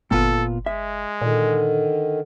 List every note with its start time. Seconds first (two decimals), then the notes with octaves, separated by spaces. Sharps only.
0.11 G1 A#2 B3 F4 A4
0.66 G#3 E5
1.21 A#2 D3 D#3